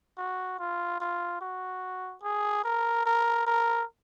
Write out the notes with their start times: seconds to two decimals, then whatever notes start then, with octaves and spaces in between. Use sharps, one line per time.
0.17 F#4
0.59 F4
1.00 F4
1.41 F#4
2.23 G#4
2.64 A#4
3.06 A#4
3.47 A#4